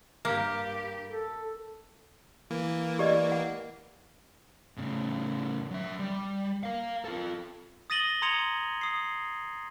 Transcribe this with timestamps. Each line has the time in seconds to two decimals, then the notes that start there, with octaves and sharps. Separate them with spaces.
0.25 G2 A#3 G4
1.09 A4
2.50 E3 A#3
2.99 G4 D5 D#5
3.32 F#5
4.78 A2 C#3
5.71 F#3 E5
5.99 G3
6.63 A#4 F5
7.05 F4 A4
7.90 D#6 A6 A#6 D#7 F#7 G7
8.22 A#5 C6 D#6 G#6 C#7 F7
8.81 D#6 C7